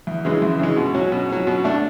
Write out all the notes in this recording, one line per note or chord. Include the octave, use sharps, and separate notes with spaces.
E2
C#3 E3 G#3
E2
C#3 E3 G#3
B2
F#3 C#4
B2
F#3 C#4
B2
A3 D4